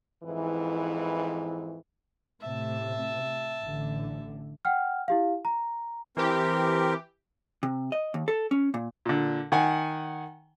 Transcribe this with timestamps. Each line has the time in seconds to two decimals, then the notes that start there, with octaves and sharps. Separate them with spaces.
0.24 F2 G#2 E3
2.40 A2 C3 E5 A5
3.62 A1 D3
4.65 F#5 G5 F6
5.08 E4 G4 F5
5.45 A#5
6.17 E3 C4 G4 A#4
7.63 C3
7.92 D#5
8.14 D#2
8.28 A4
8.51 C#4
8.74 A#2
9.05 A#2 D3
9.52 D#3 F#5 G#5